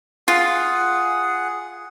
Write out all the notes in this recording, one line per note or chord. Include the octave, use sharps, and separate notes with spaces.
F4 G#4 F#5